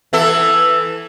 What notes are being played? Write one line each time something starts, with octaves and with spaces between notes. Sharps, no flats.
E3 E4 A4